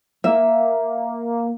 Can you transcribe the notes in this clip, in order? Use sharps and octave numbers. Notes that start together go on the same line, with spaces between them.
A#3 E5